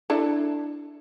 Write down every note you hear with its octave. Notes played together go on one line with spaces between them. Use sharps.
D4 E4 A4